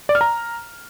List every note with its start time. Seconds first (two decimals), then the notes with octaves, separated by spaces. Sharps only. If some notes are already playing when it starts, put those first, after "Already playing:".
0.09 D5
0.15 F6
0.21 A#5